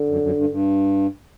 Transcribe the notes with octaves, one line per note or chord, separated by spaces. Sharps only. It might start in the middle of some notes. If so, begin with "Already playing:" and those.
Already playing: D3
F#2
F#2
G2
G2